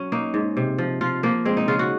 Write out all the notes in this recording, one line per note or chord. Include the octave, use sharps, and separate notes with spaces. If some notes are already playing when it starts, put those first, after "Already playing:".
Already playing: F#3 C#4
A#3 D#4
G#2
C3
F3
F3 F4
F3 A#3
G#3 C4
D#4
C#3 F4
F#4